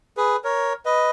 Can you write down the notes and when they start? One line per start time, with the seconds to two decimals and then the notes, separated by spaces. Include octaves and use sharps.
0.17 G#4 B4
0.44 A#4 C#5
0.85 B4 D#5